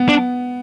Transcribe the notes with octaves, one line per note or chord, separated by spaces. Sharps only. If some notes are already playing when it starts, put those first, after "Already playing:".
Already playing: B3
D4